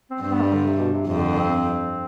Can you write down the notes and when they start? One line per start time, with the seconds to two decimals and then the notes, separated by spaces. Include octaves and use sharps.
0.11 C4
0.21 G2 C4
0.33 B3
0.43 G3
0.54 D3
0.65 C3
0.79 B2
0.93 C3
1.07 F2 C3
1.18 D3
1.29 D3
1.39 C4
1.50 C4